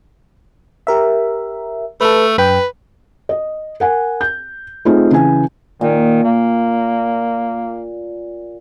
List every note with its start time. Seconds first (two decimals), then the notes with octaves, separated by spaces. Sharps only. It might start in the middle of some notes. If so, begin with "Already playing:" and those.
0.87 G4 A#4 E5
2.01 A3 A4 B4
2.38 F#2 B4 G5
3.29 D#5
3.80 A#4 F#5 G#5
4.21 G6
4.85 A3 C4 D#4 F4 G#4
5.11 C#3 E3 G#5
5.81 A#2 D#3
6.24 A#3